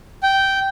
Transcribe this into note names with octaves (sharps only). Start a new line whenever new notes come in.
G5